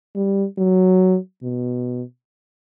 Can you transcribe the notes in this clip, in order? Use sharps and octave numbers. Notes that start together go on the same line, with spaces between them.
G3
F#3
B2